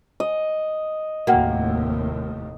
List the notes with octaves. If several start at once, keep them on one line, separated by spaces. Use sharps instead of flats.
D#5
F1 D#2 A2 A#3 F#4 F#5 G5